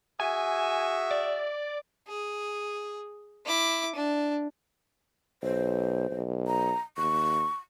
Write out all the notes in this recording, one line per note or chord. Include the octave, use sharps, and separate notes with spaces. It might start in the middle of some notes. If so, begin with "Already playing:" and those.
F#4 G#4 E5 G#5
D5
G#4
E4 D6
D4
B1 C5
B1
A#5
D#2 C#6